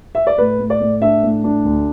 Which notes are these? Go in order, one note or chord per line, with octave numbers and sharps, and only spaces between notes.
E5
D5
A2 B4
A2
D5
A2
D4 E5
A2
D4
D2